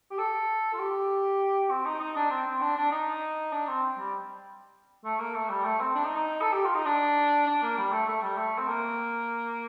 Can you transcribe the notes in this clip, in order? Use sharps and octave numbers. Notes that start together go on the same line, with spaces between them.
G4
A4
F4
G4
C4
D#4
D#4
D4
C4
C4
D4
D4
D#4
D4
C4
G3
A3
A#3
A3
G3
A3
C4
D4
D#4
D#4
A4
G4
F4
D#4
D4
D4
A#3
G3
A3
A3
G3
A3
C4
A#3